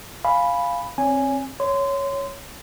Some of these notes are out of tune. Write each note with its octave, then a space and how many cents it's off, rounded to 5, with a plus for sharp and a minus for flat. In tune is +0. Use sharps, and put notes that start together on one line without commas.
F5 +0 G#5 +0 B5 +0
C4 +25 C#5 +30 G#5 +0
C#5 +0 C6 -25